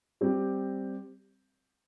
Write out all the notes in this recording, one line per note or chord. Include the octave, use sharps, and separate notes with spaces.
G3 C4 G4